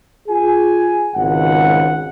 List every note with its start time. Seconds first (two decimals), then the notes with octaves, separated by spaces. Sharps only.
0.28 F4 G#4 G#5
1.14 G#1 C#2 F#5